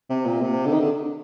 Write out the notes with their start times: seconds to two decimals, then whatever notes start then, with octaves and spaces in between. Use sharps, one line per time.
0.09 C3
0.25 A#2
0.42 C3
0.65 D3
0.72 D#3
0.80 D3